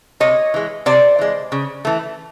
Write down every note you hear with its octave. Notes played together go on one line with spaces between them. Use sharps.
C3 C#5 D#5
E3 G#3
C3 C5 D5
E3 G#3
C#3
E3 A3